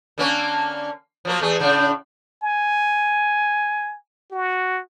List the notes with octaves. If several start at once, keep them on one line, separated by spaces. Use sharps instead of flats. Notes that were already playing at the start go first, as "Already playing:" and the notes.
D3 A#3 C#4
F3 F#3 A#3
E2 A3 G#4
A2 C#3 D4
G#5
F#4